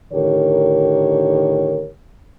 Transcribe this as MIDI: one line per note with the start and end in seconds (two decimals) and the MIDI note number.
0.13 1.88 45
0.13 1.88 50
0.13 1.88 51
0.13 1.88 67
0.13 1.88 70
0.13 1.88 73